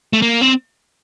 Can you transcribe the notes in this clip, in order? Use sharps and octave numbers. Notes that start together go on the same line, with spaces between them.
A3
A#3
C4